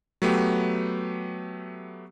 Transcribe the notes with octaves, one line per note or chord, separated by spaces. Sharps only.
F#3 A3 B3 G4